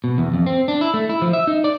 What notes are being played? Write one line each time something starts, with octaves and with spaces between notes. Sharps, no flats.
B2
E2
F2
C4
D4
E4
A3
E4
F3
E5
D#4
D5